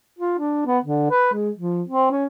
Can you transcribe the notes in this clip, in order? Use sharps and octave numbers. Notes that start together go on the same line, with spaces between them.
F4
D4
B3
D3
B4
G#3
F3
C4
C#4